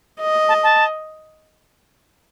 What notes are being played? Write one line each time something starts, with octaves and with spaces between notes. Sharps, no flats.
D#5
A5
A5